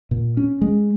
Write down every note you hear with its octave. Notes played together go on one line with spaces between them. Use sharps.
A#2
C#4
G#3